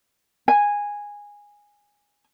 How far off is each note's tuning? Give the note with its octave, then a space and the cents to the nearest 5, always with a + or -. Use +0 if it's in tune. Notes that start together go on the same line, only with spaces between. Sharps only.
G#5 -10